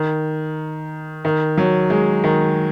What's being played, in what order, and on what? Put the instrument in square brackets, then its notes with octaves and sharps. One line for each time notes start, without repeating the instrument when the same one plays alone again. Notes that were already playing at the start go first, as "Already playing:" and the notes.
Already playing: [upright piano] D#3
D#3
F#3
G#3
D#3